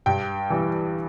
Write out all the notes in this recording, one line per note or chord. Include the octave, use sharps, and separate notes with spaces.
G2 G5
E3 G3